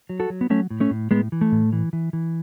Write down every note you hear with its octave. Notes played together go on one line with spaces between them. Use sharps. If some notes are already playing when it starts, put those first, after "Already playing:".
F#3
F#4 A4
F#3
B3
F#3 A3 C#4
A2
A3 C#4
A2
A2 G#3 B3
E3
A3
A2
E3
E3
E3